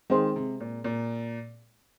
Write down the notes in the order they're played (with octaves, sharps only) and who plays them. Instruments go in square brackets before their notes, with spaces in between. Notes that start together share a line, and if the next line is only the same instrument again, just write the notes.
[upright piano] D#3 [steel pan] G#3 C4 G#4 C5
[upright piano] C3
A#2
A#2